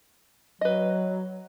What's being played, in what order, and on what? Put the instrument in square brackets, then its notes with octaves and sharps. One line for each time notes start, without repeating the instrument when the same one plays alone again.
[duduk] F#3 [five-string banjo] B4 D#5